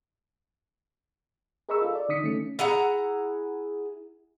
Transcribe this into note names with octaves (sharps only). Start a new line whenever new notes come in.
G#4 A#4 D#5 B5 C#6 E6
F4 A4
D5
D3 D#4 D#6 B6 C#7
D#3 A3 C#4 C#7
E4 G#4 F#5 A#5